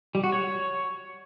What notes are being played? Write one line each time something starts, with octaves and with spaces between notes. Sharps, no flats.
G3
F#4
C#5